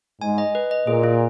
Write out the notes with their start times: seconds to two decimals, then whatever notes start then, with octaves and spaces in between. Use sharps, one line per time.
0.21 G#2 G#5
0.38 D#5
0.55 B4
0.71 D#5
0.87 A#2 G#4
1.03 F4